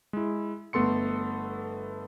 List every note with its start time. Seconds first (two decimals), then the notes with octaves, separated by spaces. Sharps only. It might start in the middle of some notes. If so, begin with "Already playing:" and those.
0.13 G#3 E4
0.73 G1 A3 B3 A4 C6 C#7